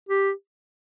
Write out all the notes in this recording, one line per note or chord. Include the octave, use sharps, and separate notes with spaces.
G4